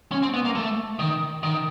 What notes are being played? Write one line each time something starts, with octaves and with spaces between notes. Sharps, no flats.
C#4
C4
B3
A#3
A3
D#3
D#3